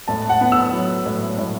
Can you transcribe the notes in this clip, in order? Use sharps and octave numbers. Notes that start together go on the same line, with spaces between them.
A2 A5
F#5
B3
E6
F#3
A2
A2